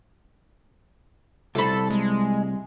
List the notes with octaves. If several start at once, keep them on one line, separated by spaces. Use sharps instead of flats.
C2 A4 B5
G#3